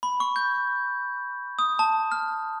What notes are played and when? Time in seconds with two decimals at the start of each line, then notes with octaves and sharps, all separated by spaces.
0.03 B5
0.20 C#6
0.36 G6
1.59 D#6
1.79 A5
2.12 F6